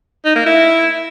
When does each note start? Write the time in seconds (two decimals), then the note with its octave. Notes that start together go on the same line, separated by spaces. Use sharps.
0.25 D#4
0.35 A#3
0.46 E4